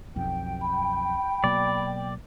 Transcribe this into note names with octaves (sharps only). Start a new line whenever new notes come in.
B1 F2 G5
B5
B2 F#3 A#3 D5